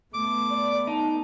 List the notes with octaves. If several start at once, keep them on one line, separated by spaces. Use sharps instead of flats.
A3 B3 D6
D5
D#4 A5